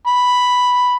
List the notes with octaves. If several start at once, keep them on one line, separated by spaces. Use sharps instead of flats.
B5